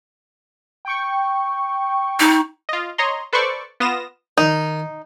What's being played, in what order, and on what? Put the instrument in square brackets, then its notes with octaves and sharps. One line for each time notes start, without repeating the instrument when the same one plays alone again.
[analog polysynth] G5 C#6
[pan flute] D#4
[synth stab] F4 D#5
C#5 D#5 A#5 C6
A4 B4 C5 D5 C#6
B3 F4 D#6 A#6 E7
[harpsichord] D#3 [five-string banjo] D#4